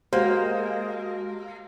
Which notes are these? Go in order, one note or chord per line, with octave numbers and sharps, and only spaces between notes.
G#3 A#3 F#4 G4 C5